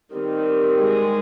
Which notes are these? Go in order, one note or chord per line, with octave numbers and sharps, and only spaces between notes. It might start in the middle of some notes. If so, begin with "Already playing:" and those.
D#3 G3 C4
G#3 G#4